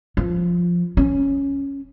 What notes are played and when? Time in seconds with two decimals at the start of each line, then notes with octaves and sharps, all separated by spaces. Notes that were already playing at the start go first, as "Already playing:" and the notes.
0.17 F3
0.97 C#4